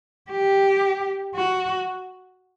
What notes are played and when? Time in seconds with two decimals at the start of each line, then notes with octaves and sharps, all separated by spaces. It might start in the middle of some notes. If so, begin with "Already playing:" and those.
0.31 G4
1.35 F#4